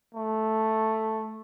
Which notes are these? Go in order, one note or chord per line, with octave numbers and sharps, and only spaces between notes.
A3